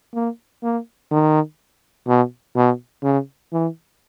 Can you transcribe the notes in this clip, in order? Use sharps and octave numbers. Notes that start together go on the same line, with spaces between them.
A#3
A#3
D#3
B2
B2
C#3
E3